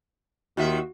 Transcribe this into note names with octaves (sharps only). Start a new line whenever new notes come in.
D#2 D#3 F4 F#4 E5